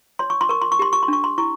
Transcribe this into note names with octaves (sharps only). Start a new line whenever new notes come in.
C#5 C6
C#6
C6
A#4 C#6
C6
C#6
G4 C6
C#6
C6
D4 C#6
C6
E4 C#6